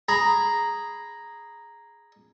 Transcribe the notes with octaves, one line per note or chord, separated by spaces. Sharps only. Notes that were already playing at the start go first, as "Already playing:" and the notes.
G#4 A#5 B5